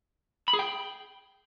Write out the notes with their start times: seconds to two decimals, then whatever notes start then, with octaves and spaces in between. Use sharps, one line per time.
0.48 B5
0.53 G#4
0.59 G5